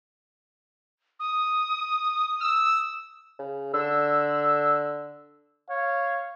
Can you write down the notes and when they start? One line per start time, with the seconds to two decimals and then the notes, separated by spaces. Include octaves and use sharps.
1.20 D#6
2.41 E6
3.39 C#3
3.74 D3 E6
5.70 C#5 F5